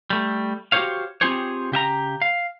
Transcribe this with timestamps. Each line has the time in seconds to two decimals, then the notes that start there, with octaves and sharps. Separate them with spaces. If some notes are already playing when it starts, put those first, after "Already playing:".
0.10 G3 A3
0.72 F#4 G4 A4 C5 C#5 F5
1.21 C4 F4 G4 G#4 C5 C#5
1.72 C#3 G4 E5 A#5
2.22 F5